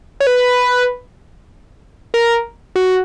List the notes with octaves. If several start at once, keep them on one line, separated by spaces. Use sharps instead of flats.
C#5
B4
A#4
F#4